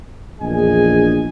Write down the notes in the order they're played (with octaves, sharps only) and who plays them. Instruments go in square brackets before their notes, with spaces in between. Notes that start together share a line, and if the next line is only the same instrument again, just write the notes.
[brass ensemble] A#1 E2 D4 G#4 D#5 G#5